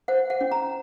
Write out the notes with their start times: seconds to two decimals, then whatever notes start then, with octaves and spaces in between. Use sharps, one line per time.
0.08 C5 F#5
0.30 F#5
0.41 C#4
0.51 A#5